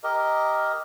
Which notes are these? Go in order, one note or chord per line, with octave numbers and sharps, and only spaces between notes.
G4 A#4 D#5